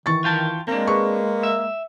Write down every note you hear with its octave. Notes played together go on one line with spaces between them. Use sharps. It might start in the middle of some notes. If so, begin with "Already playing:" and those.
D#3 E3 C#6 A6
D#3 F4 G5 A5
G#3 A#3 C4 D4
G#4 B4 C#6
E5